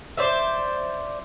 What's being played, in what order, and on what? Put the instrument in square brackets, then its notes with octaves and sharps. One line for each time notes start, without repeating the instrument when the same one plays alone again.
[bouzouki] C5 D5 E5